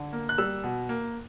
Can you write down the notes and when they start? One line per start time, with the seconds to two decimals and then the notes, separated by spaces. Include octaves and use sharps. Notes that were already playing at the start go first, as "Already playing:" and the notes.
Already playing: D3
0.13 A#3
0.29 F#6
0.38 G3 E6
0.64 B2
0.89 A#3